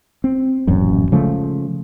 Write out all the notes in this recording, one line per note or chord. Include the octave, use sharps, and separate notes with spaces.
C4
D#1 A1 F#2
C#3 F3 G#3 A3